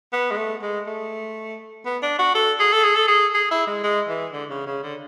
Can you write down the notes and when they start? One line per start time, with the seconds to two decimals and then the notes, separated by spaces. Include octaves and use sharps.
0.13 B3
0.31 G#3
0.37 A3
0.62 G#3
0.87 A3
1.86 B3
2.03 D4
2.19 F#4
2.35 A4
2.59 G#4
2.73 A4
2.84 G#4
2.95 A4
3.08 G#4
3.34 G#4
3.51 E4
3.67 G#3
3.84 G#3
4.09 E3
4.33 D3
4.50 C#3
4.67 C#3
4.83 D3